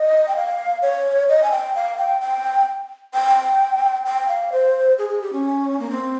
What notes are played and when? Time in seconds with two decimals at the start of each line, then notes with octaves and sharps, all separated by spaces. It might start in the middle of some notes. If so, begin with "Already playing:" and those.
Already playing: D#5
0.28 G5
0.36 F5
0.82 C#5
1.29 D#5
1.43 G#5
1.51 G5
1.75 F5
1.98 G5
2.21 G5
3.14 G5
4.06 G5
4.28 F5
4.52 C5
4.98 G#4
5.09 G#4
5.21 G4
5.33 C#4
5.80 A#3
5.91 C4